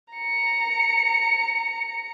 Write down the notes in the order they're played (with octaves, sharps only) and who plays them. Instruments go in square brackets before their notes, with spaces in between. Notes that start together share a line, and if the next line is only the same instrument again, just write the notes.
[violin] A#5 C#7